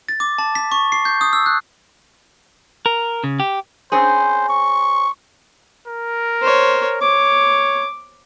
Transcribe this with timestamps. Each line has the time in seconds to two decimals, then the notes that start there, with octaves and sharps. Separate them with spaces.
0.09 A6
0.20 D6
0.38 A5
0.55 B6
0.72 C#6
0.92 C7
1.05 G6
1.21 D#6
1.33 E6
1.46 F#6
2.86 A#4
3.24 C#3
3.40 G4
3.92 C4 C#4 G#4 C5
4.49 C#6
5.87 A#4
6.42 C5 C#5
7.02 C#5 D6